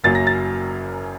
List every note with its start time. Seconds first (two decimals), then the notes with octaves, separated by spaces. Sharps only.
0.04 F#1 F#2 F#3 A#3 A6
0.15 A#6
0.27 A6